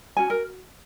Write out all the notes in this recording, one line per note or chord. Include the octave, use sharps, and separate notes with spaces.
C#4 F#4 G#5
A#4